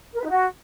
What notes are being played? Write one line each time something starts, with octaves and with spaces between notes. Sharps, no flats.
A#4
B4
D#4
F#4